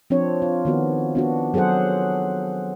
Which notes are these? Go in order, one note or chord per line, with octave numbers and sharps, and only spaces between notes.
F3 C4 D4 C#5
F4
D#3 B3 F#4
B3 D4 F#4
F#3 G#4 A4 C5 F#5